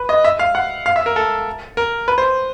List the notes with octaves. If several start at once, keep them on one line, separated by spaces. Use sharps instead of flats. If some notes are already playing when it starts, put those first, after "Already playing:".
Already playing: B4
D#5
E5
F5
F#5
F5
E5
A#4
A4
A#4
B4
C5